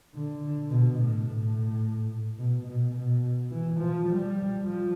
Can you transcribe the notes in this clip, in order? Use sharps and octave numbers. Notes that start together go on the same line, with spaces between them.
D3
B2
A2
A2
B2
B2
B2
E3
F3
G3
F3